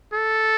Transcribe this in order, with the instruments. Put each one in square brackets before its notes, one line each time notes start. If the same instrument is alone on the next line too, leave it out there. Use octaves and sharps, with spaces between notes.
[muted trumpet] A4